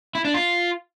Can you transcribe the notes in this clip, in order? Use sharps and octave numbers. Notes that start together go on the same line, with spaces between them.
E4
D4
F4